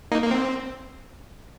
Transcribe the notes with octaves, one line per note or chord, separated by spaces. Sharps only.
A#3 D#4
A#3
C4